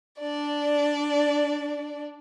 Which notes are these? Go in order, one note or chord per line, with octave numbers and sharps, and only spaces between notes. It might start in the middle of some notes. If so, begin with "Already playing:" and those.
D4 D5